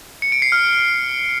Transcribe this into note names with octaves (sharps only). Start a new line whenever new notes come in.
C#7
D7
C7
F6